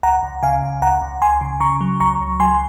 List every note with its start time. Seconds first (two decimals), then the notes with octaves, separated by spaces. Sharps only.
0.03 C#2 F#5 A#5
0.23 C#2
0.43 C#3 F5 G#5
0.63 C#2
0.82 C#2 F#5 A#5
1.01 C#2
1.21 C#2 G#5 C6
1.41 C#3
1.60 C#3 A#5 C#6
1.81 F#3
2.00 C#2 A#5 C#6
2.20 C#2
2.40 F#3 G#5 C6